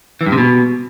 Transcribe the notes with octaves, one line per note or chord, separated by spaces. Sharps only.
E3
G2
C3
B2